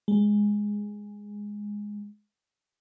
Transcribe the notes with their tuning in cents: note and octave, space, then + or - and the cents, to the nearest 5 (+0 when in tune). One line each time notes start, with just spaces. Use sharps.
G#3 -5